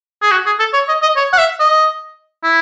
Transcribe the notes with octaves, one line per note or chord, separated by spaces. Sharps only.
G#4
F#4
G#4
A4
C#5
D#5
D#5
C#5
F#5
E5
D#5
E4